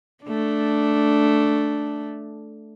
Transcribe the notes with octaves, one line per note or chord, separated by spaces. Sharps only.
A3 D4